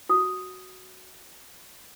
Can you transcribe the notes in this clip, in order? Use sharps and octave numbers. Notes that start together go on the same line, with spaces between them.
F#4 D#6